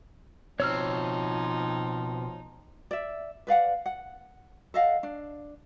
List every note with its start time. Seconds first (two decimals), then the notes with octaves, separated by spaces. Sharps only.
0.60 B2 F3 C4 D#4 C#5 E6 F6
2.91 D5 E5
3.47 B4 D5 F5 F#5
3.86 F#5
4.74 A4 D#5 F5 F#5
5.03 D4